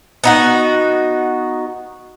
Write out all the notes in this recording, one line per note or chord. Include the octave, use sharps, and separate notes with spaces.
B3 D#4 F#4